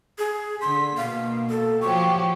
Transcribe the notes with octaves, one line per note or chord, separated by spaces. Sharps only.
G#4
D3 C6 B6
B2 A#3 F5
A4
F3 F#3 G4 C#6